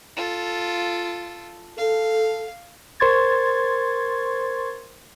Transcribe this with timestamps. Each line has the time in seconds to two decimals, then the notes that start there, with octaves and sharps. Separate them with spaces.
0.17 F4 A4
1.78 A4 F5
3.00 A#4 C5 C6 C#6 G#6 A6